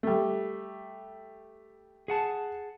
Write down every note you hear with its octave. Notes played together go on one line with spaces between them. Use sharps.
G3 A3
G#4 F#5 A5